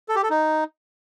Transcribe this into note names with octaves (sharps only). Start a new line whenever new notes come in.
A4
G4
A4
D#4